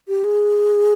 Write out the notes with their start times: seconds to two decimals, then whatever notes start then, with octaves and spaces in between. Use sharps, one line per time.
0.08 G4
0.24 G#4